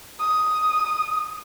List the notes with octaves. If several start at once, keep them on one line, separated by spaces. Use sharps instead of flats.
D#6